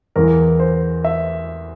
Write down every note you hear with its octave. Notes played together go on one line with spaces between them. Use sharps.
E2 E3 A#4
C5
E5